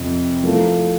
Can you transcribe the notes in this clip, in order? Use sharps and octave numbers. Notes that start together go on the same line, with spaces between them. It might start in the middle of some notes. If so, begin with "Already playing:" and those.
Already playing: F2 C3
F3 A3 E4 A4